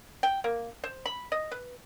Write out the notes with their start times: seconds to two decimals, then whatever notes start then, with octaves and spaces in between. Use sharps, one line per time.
0.23 G5
0.44 A#3
0.84 C5
1.06 B5
1.32 D#5
1.51 B4